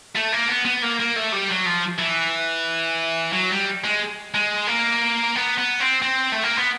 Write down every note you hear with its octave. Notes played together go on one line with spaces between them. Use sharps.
A3
A#3
B3
B3
A#3
A#3
A3
G3
F#3
F3
E3
F#3
G3
G#3
G#3
A#3
B3
B3
C4
C4
A3
A#3
B3